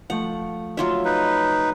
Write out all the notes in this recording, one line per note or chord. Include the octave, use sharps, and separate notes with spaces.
F3 A3 F#5
F#3 F4 E5
D#4 B4